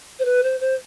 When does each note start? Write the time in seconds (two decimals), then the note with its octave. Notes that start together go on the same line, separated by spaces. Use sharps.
0.19 C5
0.24 B4
0.43 C5
0.60 C5